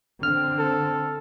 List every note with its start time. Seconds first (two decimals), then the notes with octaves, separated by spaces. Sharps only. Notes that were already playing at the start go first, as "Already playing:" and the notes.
0.23 D3 C4 F6
0.58 A4